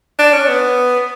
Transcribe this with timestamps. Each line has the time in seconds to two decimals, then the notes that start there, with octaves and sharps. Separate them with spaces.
0.19 D4
0.33 C#4
0.48 B3